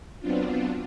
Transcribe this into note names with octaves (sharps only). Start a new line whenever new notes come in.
F#3 B3 C4 D4 F4